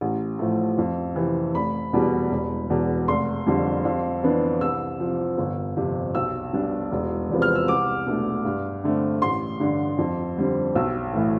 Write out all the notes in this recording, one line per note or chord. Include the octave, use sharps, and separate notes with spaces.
A1
A2 F3 A3
F2
C3 E3
F1 B5
E2 B2 G3
E1
E2 B2
F1 C6
F2 D3 G3
F2
E3 B3 D4
C2 E6
C3 F3
G1
F2 C3
B1 E6
B2 G3 D4
E1
E2 C3 F3 B3
F6
E6
C2 D6
B2 A3 D4
G2
D3 A3 C4
A1 C6
G2 D3
F2
D3 G3 C4
B1 E6
A2 E3 A3